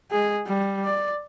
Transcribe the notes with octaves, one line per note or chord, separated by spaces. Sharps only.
G#3 G#4
G3
D5